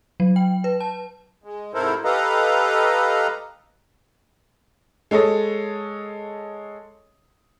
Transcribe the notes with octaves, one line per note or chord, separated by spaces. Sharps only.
F#3
G5
B4
A5
G#3
G#2 C3 E4 A4 A#4 C5
G4 A4 B4 D#5 F5 A#5
G#3 A4 C#5 D#5